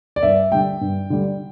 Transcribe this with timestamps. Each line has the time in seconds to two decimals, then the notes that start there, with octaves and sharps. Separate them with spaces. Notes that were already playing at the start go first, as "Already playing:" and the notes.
0.16 D5
0.23 G2 E5
0.52 D3 G3 G5
0.81 G2
1.10 D3 G3